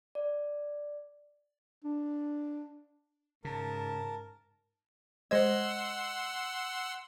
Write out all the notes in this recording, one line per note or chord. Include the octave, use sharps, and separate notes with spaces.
D5
D4
G#2 C#3 A#4 A5
G#3 C5 D#5 F#5 C6 E6 G#6